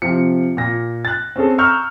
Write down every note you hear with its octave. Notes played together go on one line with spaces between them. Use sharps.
C3 F3 F4 C#7
A#2 A#6
F#6 A6
C4 C#4 G#4 A4
A#5 C#6 E6 F6 G6